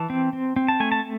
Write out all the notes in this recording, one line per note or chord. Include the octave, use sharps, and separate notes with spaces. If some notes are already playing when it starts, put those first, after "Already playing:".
Already playing: E3 A5
C4
C4
C4
A5
A3 G#5
A5